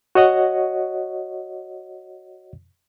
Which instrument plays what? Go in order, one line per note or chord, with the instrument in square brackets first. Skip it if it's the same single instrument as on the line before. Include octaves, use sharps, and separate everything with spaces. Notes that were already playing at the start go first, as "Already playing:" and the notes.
[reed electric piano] F#4 C#5 D#5 F#5